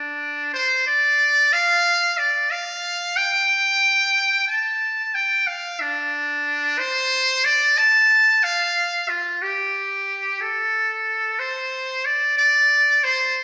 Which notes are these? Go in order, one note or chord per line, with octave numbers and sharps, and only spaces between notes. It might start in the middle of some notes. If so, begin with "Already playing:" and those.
Already playing: D4
C5
D5
F5
D5
F5
G5
A5
G5
F5
D4
C5
D5
A5
F5
F4
G4
A4
C5
D5
D5
C5